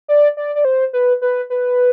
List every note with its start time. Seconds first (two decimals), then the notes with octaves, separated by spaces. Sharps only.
0.08 D5
0.37 D5
0.55 D5
0.65 C5
0.93 B4
1.22 B4
1.50 B4